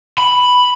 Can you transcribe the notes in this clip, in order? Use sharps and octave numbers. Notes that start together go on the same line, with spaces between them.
B5